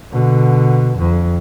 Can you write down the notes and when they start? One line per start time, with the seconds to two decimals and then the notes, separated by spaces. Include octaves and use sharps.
0.13 B2 D3
0.98 F2